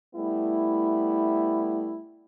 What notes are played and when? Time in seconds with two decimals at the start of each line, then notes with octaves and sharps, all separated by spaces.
0.15 G3 A3 B3 E4